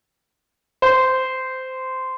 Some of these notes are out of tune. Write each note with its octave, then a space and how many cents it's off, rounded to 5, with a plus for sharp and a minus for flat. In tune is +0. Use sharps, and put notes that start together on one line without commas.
C5 -15